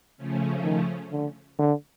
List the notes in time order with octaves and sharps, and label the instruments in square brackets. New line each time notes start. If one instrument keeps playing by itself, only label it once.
[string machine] C#3 F3 A3 C#4
[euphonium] D#3
D3
D3